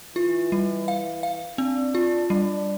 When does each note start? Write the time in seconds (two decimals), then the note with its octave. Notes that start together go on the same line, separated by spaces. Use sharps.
0.16 E3 F4
0.52 G3
0.88 F5
1.23 F5
1.58 C4 D4
1.95 F4
2.30 G3 D4